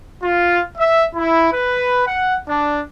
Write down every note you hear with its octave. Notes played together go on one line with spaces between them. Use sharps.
F4
E5
E4
B4
F#5
D4